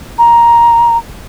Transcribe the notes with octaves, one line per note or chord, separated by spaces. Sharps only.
A#5